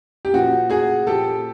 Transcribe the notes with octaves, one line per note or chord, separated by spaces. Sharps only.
G4
A#2 F3 F#4
F#4 G#4
A#2 F3 G4 A4